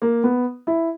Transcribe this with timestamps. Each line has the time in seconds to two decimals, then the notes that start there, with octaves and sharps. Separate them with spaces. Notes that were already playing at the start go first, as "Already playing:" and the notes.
0.02 A#3
0.24 B3
0.67 E4